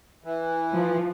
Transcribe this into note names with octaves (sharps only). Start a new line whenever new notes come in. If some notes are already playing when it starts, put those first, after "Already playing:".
E3
F3